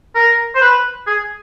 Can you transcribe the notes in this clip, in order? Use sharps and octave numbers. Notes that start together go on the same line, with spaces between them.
A#4
C5
B4
G#4